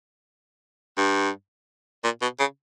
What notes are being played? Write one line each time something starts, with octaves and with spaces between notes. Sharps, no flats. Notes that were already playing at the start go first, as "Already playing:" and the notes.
G2
A#2
B2
C#3